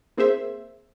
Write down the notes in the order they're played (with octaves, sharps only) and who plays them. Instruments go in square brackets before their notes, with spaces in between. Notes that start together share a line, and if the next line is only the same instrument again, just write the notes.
[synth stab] A#3 C4 G#4 C5 E5